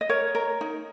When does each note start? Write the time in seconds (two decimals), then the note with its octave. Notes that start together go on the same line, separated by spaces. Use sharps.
0.01 D#5
0.09 A#4 C#5
0.35 A#4
0.61 D#4